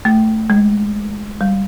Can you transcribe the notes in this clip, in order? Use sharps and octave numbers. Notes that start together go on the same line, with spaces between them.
A3
G#3
G3